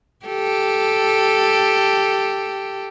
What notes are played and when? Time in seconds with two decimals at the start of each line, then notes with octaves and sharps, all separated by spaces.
0.26 G4 A4